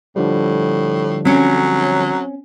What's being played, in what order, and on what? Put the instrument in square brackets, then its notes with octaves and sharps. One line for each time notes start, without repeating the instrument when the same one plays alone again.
[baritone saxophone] A2 [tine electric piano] D3 F3 G3
[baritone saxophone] F#3 [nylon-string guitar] C4 C#4